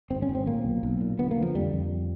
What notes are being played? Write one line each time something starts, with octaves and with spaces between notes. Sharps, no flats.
G#1 C4
C#4
G#1
C4
A#2 A#3
B1
B1
A#2
D3 B3
A#3
D3
F3
F2 G3
F2